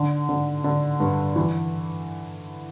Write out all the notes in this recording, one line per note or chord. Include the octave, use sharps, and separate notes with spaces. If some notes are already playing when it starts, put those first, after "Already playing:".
Already playing: D3
D3
D3
G2
E3